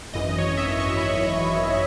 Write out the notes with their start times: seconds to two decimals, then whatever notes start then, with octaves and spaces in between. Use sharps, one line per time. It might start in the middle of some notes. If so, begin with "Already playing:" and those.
0.13 G#1 F#2 E3 D#5
0.38 C#5
0.57 E5
0.63 D#5
0.79 C#6
0.97 B5